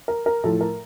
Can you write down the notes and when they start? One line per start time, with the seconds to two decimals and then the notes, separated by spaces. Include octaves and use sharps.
0.08 A#4
0.26 A#4
0.44 A2 F3 A4
0.61 A#4